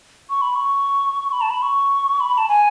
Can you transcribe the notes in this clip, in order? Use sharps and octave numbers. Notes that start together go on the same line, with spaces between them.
C#6
B5
C#6
B5
A5
B5
C#6
B5
A5
G#5